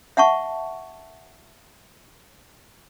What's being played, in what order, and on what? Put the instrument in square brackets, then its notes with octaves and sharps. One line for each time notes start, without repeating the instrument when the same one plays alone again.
[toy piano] E5 F#5 A5 C#6